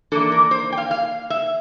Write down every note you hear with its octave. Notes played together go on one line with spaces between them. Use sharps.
E3 A#3 D4 A4
A#4
C5
G5
F5
F5
E5